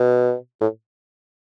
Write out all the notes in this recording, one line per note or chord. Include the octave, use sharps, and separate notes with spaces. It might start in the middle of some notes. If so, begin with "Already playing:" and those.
Already playing: B2
A2